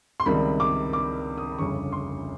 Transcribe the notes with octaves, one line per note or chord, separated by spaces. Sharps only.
C6
C#2 C3 D#3 G3 B5
D6
D6
D#6
G1 F2 C#3 C#6
C6